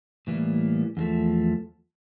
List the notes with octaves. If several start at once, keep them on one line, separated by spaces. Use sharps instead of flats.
A2 E3 G3 A#3
E2 D3 F3 A3